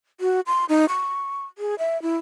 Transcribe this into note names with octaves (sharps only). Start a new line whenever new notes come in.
F#4
C6
D#4
C#6
G#4
E5
E4